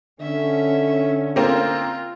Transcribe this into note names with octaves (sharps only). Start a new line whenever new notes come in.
D3 C#4 E5
A#3 C4 F4